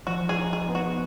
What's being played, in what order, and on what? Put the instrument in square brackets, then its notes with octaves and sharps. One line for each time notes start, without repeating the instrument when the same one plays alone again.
[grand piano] F3 [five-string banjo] F#4
[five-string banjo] G#4
[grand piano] D#4
[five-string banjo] G#4
[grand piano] B3
[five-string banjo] F#4